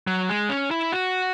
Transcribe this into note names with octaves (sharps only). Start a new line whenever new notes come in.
F#3
G#3
C#4
E4
F#4